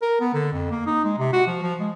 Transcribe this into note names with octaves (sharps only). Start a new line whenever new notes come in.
A#4
B3
D3
F2
A#3
D#4
G#3
C3
F#4
F3
F3
G#3